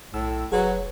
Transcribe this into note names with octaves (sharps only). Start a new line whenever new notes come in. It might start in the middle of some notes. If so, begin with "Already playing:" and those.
B1 A2 E6
F1 F#3 G#4 B4 C#5